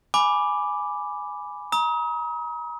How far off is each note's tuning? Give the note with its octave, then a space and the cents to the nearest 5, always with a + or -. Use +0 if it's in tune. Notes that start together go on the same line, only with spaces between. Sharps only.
G#5 +0 B5 +0 D6 +0
A#5 +35 D#6 +35